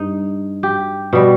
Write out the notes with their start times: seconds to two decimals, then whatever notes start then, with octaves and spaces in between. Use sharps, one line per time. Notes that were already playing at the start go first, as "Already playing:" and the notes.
Already playing: G2 D#4
0.63 G4
1.13 B2 G3